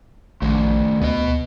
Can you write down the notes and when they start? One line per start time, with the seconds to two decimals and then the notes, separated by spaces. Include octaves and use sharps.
0.42 A#1 D#3 A3
1.02 D2 B3 D#5